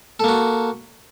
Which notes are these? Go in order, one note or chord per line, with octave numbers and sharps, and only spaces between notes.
A#3 F#4 A4